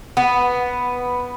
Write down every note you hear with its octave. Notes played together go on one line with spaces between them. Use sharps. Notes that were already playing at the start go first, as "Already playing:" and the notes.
B3